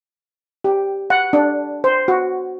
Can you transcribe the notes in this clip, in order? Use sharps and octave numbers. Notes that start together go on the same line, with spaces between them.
G4
F#5
D4
C5
F#4